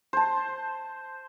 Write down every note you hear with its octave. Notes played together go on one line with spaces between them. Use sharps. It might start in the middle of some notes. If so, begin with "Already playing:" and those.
C5 A5